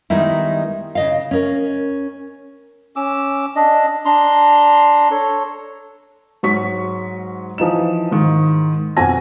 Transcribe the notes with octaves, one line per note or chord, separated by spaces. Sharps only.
D#3 G3 G#3 B3 D#4 E4
C#3 D#5 F5
C#4 A#4
C#4 D6 E6
D4 D#5
D4 A#5 C6
A4 C#5
G#2 F#3 C#6 B6
E3 F3 D#4 E7
G#2 D#3
F2 B2 F#4 G#5 A#6